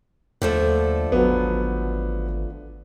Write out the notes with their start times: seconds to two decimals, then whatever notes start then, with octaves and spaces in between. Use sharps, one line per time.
0.42 D#2 D3 F3 A3
1.12 G#1 F#3 B3